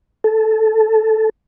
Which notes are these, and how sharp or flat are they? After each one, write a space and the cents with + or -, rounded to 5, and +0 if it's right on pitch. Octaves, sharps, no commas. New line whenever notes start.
A4 -5